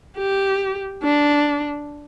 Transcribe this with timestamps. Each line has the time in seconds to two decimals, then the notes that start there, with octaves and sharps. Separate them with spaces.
0.18 G4
1.03 D4